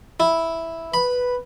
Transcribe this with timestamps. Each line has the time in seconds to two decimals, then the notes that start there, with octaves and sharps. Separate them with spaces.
0.20 E4
0.94 B4 B5